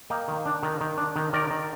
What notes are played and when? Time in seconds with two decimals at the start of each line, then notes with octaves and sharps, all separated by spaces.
0.10 A#3 D#5 G5
0.28 D#3
0.46 D4
0.63 D#3
0.81 D#3
0.98 D4
1.16 D#3
1.33 D#3 A#4 D5
1.51 D#3